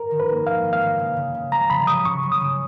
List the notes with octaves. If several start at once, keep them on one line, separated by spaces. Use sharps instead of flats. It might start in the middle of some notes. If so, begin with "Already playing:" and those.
Already playing: A#4
D#3
B4
A#3
C#4 F5
C#4
F5
A#3
C#3
C#3
C#3
G#3 A#5
C#3 B5
C#3 D#6
C#3 C#6
F#3
D#6
C#3